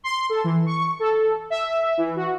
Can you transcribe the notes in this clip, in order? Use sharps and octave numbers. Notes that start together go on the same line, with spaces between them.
C6
A4
E3
C#6
A4
E5
E3
F#4